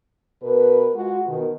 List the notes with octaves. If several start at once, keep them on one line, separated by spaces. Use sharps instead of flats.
B2 A#4 B4
G#3 F4 F#4
B2 D#3